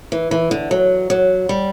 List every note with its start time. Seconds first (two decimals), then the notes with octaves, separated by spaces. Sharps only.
0.12 E3
0.31 E3
0.51 D3
0.71 F#3
1.10 F#3
1.49 G3